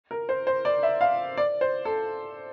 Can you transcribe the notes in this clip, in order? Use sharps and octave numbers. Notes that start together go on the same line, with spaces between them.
A#4
C5
C5
D5
E5
F5
D5
C5
A4